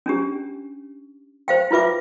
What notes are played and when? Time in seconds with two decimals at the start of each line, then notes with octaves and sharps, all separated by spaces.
0.06 C#4 D4 G4
1.48 C5 F5 G5
1.71 E4 F4 B4 E5 D6